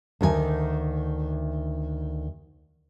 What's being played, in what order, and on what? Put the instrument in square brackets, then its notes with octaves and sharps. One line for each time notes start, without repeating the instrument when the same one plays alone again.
[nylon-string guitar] D2 D#3 A#4 G#5